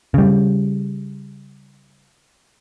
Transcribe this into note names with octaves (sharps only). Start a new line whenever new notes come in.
C#3 G3